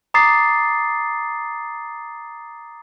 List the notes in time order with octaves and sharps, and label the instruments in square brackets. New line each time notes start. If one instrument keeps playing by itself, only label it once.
[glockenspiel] A#5 D6 D#6 A6 C7